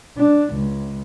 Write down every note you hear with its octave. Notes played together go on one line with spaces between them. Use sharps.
D4
C#2